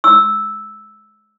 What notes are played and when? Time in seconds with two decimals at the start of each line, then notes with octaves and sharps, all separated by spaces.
0.04 E6